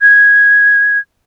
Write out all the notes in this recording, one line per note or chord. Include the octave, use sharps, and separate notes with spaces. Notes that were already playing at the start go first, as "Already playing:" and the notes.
G#6